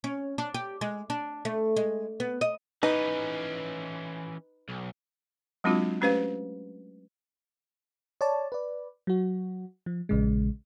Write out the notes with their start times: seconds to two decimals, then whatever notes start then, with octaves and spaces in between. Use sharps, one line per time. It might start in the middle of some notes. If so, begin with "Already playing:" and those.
0.04 C#4
0.38 D4
0.54 G4
0.81 G#3
1.10 D4
1.45 A3
1.76 G#3
2.20 B3
2.41 D#5
2.83 E3 C#4 D#4 B4
4.69 B1
5.64 F#3 G#3 C4 D4 F4 F#4
6.01 A3 C#4 G4 B4 C5 F5
8.21 C#5 D5 A5
8.52 B4 D5
9.07 F#3 F#4
9.86 F3
10.09 A#1 C#3 G#3